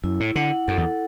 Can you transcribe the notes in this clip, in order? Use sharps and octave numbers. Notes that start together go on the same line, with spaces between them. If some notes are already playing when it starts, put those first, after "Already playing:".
F#2 E4
A2
D3 F#5
F#2 A4
E2